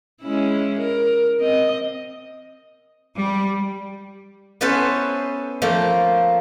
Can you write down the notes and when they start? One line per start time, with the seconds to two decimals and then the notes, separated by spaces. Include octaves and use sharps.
0.22 G#3 C#4 E4
0.79 A#4
1.40 C4 D#5
3.16 G3
4.61 B3 C#4 E4 A4 B4 C5
5.62 F3 A3 A#3